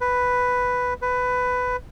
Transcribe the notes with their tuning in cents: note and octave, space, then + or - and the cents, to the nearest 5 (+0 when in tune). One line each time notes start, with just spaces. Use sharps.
B4 +5
B4 +15